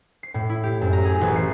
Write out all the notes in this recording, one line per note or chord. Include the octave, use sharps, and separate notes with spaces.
C7
A2
E4
G4
F#2
A#5
G#4
A1
C7